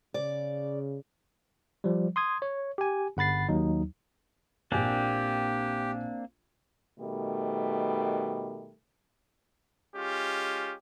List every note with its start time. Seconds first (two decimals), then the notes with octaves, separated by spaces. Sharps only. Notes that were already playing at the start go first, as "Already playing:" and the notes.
0.14 C#3 D5
1.84 F3 G3
2.16 C6 D#6 G#6
2.42 C#5
2.78 G4 G#5
3.17 G1 F#5 B5 A6 C7
3.49 D#2 F#3 D#4
4.72 A#1 A#3 C4 D4 G4 G#5
6.99 B2 D#3 G3 A3
9.96 G#3 C#4 F4 G4